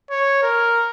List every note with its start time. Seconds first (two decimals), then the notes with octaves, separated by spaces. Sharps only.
0.11 C#5
0.43 A#4